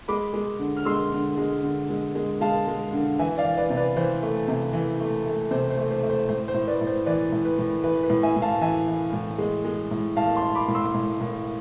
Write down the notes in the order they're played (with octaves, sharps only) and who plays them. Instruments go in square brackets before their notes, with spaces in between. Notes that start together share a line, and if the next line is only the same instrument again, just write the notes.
[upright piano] G#3 B5 D6
G#3
D3
F6
G#3 C6 E6
D3
G#3
D3
G#3
G#3
G#3 F5 A5
G#3
D3
E3 E5 G#5
D5 F5
E3
B4 D5
C3
B4 D5
E3 C5
A3
C3
E3
A3
A3
C3 C5
C5
A3
C5
A3
C5
A2 C5
C5
A2
B4 D5
A2
C5
E3 B4 D5
A2
B4
A2
E3 B4
B4
A2
E5 G#5
A2
F5 A5
E3 E5 G#5
E3
A2
G#3
G#3
A2
A2 F5 A5
A5 C6
A2
B5 D6
A2
C6 E6
A2
A2